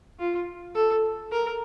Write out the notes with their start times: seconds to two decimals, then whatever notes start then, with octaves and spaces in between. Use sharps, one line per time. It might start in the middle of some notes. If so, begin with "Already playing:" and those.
0.19 F4
0.75 A4
1.31 A#4